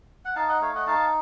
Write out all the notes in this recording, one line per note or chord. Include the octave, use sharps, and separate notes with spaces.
F#5
D#4 F5 A5
D#5 F#5
A3 C#5 F5
D#5 F#5
D#4 F5 A5